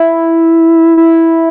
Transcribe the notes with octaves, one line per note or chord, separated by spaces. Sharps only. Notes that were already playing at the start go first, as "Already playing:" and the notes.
Already playing: E4
E4